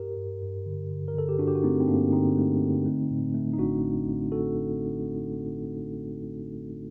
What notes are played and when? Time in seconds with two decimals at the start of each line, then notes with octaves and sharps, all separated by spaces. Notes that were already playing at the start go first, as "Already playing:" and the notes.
Already playing: G2 G4 A#4
0.17 G2
0.42 G2
0.66 D3
0.90 D3
1.08 A#4
1.15 D3 A4
1.29 G4
1.39 G2 D4 F#4
1.48 G4
1.55 F#4
1.63 A3 C4 D#4
1.80 C4
1.88 G2 A#3 D4
2.12 D3 C4 D#4
2.37 A3
2.61 D3
2.86 A3
3.10 A2
3.34 A3
3.53 D#4
3.58 A1 D4 F#4
3.83 A1
4.07 A1
4.32 F#4 A4